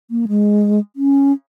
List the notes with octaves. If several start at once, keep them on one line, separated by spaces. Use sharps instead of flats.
A#3
G#3
C#4